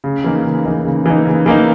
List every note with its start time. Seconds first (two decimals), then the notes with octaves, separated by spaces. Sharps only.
0.04 C#3
0.24 E3 A#3 D#4
0.45 C#3
0.65 E3 A#3 D#4
0.85 C#3
1.06 E3 A#3 D#4
1.25 C#3
1.46 E3 A#3 D#4